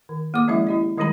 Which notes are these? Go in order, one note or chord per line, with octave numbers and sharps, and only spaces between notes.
D#3
A#3 G#4 D6
F3 G#3 C#4 E4 E5
E4 G4 D#5
D#3 G3 G#3 D#4 G#4 A#5